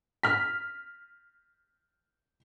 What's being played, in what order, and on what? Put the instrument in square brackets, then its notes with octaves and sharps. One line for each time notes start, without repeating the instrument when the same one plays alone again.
[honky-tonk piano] F6 B6